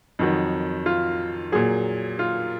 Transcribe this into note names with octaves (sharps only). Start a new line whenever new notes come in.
F2 D#3 F#3
F4
A#2 F#3 G#4
F4